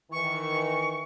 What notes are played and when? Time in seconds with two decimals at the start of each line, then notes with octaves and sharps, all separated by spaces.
0.11 D#3 E3 C#6